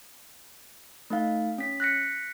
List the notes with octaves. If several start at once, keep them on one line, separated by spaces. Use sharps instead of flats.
A3 D#4 F5
C#4 B6
F#6 A#6 B6 C#7